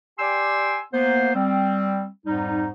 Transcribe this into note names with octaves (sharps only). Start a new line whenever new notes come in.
G4 D5 G5 G#5 C6 E6
A#3 B3 C5
G3 C4
F2 G#2 G3 D#4